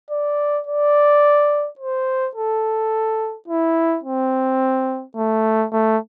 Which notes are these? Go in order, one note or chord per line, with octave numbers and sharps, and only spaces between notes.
D5
D5
C5
A4
E4
C4
A3
A3